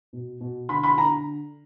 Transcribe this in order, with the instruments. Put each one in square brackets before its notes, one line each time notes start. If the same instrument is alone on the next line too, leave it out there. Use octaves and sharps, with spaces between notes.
[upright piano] B2
B2
D3 B5
B5
D3 A#5